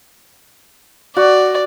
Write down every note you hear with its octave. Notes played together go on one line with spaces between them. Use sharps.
F#4 D5